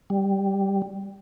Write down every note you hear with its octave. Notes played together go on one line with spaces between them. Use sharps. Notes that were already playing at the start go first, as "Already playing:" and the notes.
G3